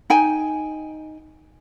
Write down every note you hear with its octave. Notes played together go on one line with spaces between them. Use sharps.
D#4 G5 G#5